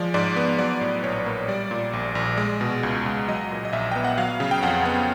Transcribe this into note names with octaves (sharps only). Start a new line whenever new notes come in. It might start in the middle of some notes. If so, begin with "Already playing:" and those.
Already playing: F3 G#3 D5
G#2 D5
B3
F#3 D5
A2
A#1 C#5
A#3
G3 D5
A#2
A#1
A#1
G#3
B2
C#2
C#2
F#3 D#5
A#2
D#5
A#1 E5
B3 G5
F#5
F#3 F5
C#3
G5
F2 F#5
B3